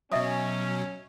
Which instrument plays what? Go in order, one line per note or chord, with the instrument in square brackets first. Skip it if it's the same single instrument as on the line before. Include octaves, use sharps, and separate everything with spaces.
[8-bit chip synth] B2 F#3 [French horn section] C#4 [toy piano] D#5 E5 D#6